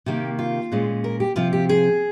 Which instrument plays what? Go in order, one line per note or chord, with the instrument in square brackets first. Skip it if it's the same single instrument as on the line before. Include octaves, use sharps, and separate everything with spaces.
[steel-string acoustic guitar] C3 D#3 A#3 G4
F4
A#2 G#3 C#4
A#4
G4
C3 F3 C4 F4
G4
G#4